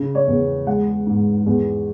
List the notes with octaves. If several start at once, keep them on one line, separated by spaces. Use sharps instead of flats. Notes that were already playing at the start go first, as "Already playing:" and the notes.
Already playing: C#3
C#5
E2
G#3 F#5
G#2
E2